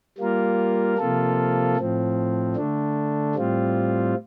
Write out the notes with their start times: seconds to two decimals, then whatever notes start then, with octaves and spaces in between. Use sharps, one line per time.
0.18 G3 A#3 F4 A#4
0.98 C3 F3 A#3 F4 A4
1.76 A2 F3 C4
2.56 D3 A3 D4
3.35 A2 G3 C4 F4